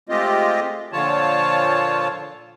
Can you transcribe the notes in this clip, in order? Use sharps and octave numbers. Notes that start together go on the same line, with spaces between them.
G#3 A3 C4 F4 G4 D#5
A#2 D3 F3 F4 C#5 A5